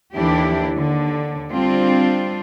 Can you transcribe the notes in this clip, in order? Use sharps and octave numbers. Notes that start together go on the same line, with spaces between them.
D#2 D3 E3 D4 E4 G4
D#2 D3
G3 C4 D4 F4